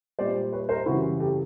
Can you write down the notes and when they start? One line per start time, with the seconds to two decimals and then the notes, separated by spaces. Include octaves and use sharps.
0.19 A#2 G3 C5 D5
0.52 B4 C#5
0.69 A#4 C5
0.86 F#2 C#3 E3 G3 E4 F#4
1.20 G4 A4